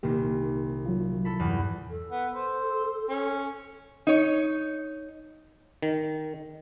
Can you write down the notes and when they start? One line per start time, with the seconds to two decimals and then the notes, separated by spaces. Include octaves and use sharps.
0.03 C2 A#2 D#3 A#3 G4
0.86 F#3 F4
1.25 E4 A4 B5
1.40 E2 G2 G5
1.90 A4
2.11 B3
2.35 C5
3.10 C#4
4.07 D#4 C#5
5.82 D#3